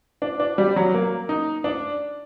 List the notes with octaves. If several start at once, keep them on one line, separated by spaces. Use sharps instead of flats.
D4
D4
G3
F#3
A#3
D#4
D4